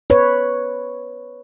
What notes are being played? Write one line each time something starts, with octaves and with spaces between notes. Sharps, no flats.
B4 C#5